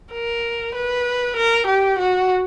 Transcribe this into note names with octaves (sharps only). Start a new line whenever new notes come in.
A#4
B4
A#4
G4
F#4